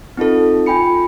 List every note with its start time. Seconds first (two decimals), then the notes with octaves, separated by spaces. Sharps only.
0.17 C4 D#4 F4 A4
0.66 F4 G5 G#5 B5 C#7